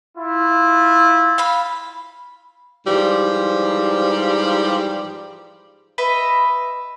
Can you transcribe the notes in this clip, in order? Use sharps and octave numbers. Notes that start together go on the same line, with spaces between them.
E4 F4
F5 B5
G#2 E3 F3 G3
B4 D#5 E5